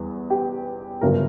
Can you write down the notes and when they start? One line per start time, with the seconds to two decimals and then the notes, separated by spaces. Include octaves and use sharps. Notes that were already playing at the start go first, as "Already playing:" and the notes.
Already playing: E2 G3 B3
0.30 G4
1.01 G1 F#2 C#3 F#3 A#4